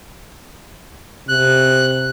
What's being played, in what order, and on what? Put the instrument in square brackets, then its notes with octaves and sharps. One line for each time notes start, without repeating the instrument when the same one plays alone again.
[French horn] C3 [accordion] F#6